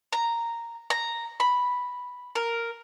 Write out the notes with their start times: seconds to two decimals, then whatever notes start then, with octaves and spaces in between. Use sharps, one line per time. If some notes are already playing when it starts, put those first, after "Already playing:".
0.13 A#5
0.90 A#5
1.40 B5
2.35 A#4